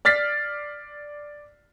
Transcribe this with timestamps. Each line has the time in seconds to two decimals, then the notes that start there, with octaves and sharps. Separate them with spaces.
0.05 D5 F6 A6 B6 C7